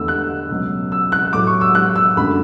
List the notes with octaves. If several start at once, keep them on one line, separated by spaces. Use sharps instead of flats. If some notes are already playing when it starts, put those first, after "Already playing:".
Already playing: E2 D3 A3 E6
F#6
C#2 B2 F#3 A3
E6
F#6
A2 F#3 A3 D6
C#6
E6
F#6
E6
F#2 D3 A3 B5